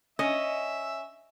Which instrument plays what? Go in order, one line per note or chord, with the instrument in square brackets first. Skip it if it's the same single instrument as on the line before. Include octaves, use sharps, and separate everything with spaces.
[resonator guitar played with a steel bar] C#4 [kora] D#5 [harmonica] E5